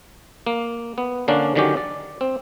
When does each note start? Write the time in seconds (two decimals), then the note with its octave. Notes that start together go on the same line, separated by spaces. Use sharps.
0.47 A#3
0.98 B3
1.28 D3 A#3 C#4 D4
1.55 D3 D#3 F#3 C#4 G4
1.77 D5
2.21 C4